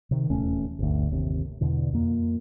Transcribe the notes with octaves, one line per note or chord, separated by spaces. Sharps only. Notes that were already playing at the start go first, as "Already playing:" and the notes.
C3 D#3
D#1 E2 A3 C#4
G1 D2
G1 D#2 C3
E2 B2 D3
F2 A#3